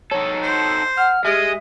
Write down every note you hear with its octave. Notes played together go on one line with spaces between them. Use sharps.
D#4 A4 C#5
C5
F#5 F6
G#3 G4 D#5 E5